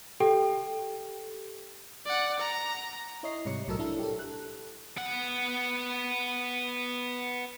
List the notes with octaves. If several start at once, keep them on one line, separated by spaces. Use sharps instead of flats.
G4 A4 G5
D5 F#5
A#5
E4 C#5 D#5 C7
G#2 C3 G3 C#5 C#7
B1 A2 F#3 A4 A#4 E6
D4 E4 A4 A#4
G4 A4
F#6
B3 F#5